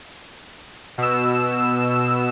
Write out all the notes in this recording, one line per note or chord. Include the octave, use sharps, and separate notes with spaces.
B2 E6